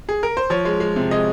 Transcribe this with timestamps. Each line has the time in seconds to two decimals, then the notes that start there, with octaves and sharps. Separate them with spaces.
0.09 G#4
0.23 A#4
0.37 C5
0.50 F3 C#5
0.65 G#3
0.80 G#3
0.96 C3
1.11 G#3 D#5